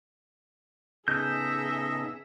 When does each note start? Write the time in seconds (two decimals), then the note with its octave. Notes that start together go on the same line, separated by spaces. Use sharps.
1.08 C#3 B3 D#4 G#4 A4 D#5 E5 G6